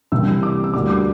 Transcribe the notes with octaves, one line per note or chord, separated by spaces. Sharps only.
C2 C3 E3 A#3 E4 E6
D6
E6
D2 D3 G3 A#3 D6
D6